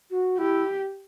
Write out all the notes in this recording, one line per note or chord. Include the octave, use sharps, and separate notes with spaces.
F#4
E4 G4